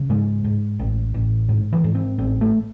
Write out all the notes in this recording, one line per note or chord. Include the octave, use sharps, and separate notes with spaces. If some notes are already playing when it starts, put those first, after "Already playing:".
Already playing: C#3
G#2 G#3
G#2
A1
A1
G#2
E3
G#2
C4
A1 C4
A3